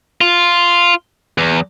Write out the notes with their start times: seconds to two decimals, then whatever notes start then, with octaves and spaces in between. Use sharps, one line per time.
0.21 F4
1.38 E2